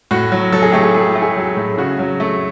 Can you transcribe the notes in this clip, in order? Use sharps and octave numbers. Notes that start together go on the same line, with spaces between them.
A2 F#4
F#3
F#3 A4
G#4
A3 G4
G#4
A3 G#4
A3
G#4
F#3
A2
C#3 F#4
F#3
A3